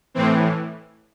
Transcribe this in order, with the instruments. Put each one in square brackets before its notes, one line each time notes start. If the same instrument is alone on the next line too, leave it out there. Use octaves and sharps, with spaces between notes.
[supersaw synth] A2 E3 C4